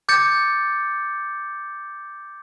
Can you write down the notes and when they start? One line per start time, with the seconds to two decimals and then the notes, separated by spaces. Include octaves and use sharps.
0.09 D6 G6 A6 C#7